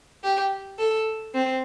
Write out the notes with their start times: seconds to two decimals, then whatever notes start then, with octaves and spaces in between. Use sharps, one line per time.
0.24 G4
0.79 A4
1.34 C4